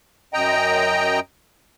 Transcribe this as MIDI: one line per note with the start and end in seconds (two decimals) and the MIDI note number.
0.34 1.20 42
0.34 1.20 75
0.34 1.20 79
0.34 1.20 82